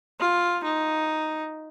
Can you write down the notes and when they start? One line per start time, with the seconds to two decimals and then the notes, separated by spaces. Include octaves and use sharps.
0.20 F4
0.64 D#4